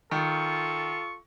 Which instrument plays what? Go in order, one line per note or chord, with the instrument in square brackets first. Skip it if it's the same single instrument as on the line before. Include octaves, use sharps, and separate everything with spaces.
[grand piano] D#3 [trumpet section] F4 A4 C#6